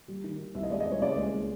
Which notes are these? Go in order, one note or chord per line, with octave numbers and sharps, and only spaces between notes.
G3
D#3
D#3
C2 E5
D#5
G#3 D5
D#5
C2
C#5
C#2 D5
G#3
G#3